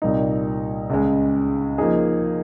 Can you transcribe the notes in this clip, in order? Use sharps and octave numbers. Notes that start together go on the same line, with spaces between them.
C2 A#2 G3 A#3 D#4
C#2 C#3 G#3
F3 A#3 D#4 G#4